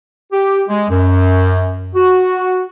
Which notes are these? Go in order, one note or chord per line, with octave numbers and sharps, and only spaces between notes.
G4
G#3
F#2
F#4